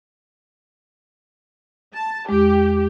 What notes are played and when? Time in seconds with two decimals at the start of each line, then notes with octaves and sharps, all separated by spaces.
1.94 A5
2.29 E2 G#3 G4